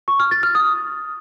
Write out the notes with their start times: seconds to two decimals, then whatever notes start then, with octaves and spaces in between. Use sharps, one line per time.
0.08 C#6
0.20 F6
0.31 A6
0.43 F6
0.55 D#6